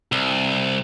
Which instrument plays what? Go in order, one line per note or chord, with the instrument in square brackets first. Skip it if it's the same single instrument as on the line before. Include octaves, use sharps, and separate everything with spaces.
[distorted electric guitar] C2